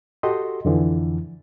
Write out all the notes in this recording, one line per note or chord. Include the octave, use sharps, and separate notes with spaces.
F#4 G4 A4 D#5 C6
F2 D3 E3 F3